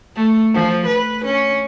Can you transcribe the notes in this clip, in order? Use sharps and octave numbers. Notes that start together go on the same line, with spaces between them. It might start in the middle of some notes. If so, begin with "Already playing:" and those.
A3
F3
B4
C#4